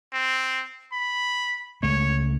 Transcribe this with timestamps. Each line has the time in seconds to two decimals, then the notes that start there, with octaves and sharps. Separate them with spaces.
0.13 C4
0.92 B5
1.83 C#2 G#3 A3 C#5